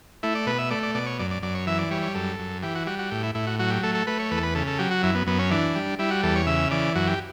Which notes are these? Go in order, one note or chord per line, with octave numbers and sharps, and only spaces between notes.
A3 E4
D5
B2 B4
E5
A3 D5
D5
B2 D5
C#5
F#2 D5
D5
F#2 D5
C#5
E3 E5
D5
G3 C#5
C#5
F#2 A4
F#2
E3 G4
F#4
G3 F#4
F#4
A2 G4
E4
A2 E4
F#4
F#3 F#4
G4
A3 A4
A4
A3 B4
C#5
E2 B4
A4
B4
C#3 A4
A4
F#3 G4
F#4
F#2 E4
B3
F#2 B3
C#4
E3 D4
G3
G3 E4
F#4
E2 A4
C#5
C#3 E5
E3 D5
F#2 F#4
G4